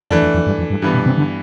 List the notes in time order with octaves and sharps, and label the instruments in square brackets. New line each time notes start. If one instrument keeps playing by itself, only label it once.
[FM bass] F2 [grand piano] E3 A3 D4
[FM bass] F2
F2
G2
F2
G2
[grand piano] G2 E3 B3
[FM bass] B2
C3
D3